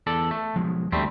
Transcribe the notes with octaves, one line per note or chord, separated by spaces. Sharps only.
E2 A4 D5
A3
B1 F3 G#3
D2 G3 A3 C4